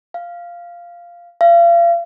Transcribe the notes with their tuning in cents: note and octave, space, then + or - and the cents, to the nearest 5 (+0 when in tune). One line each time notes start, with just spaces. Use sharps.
F5 -5
F5 -35